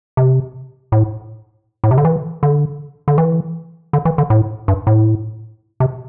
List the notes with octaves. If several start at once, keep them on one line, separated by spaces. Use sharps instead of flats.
C3
A2
A2
C3
D3
E3
D3
D3
E3
D3
E3
D3
A2
G2
A2
C3